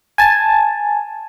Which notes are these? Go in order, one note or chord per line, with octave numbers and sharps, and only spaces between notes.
G#5 A5